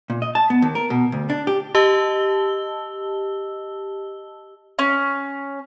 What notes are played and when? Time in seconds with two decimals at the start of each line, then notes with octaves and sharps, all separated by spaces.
0.10 A#2
0.22 D#5
0.35 A5
0.50 B3
0.62 D#2
0.75 A#4
0.90 B2
1.12 D2
1.30 D4
1.47 G4
1.75 G4 D#5 A5 E6 G7
4.79 C#4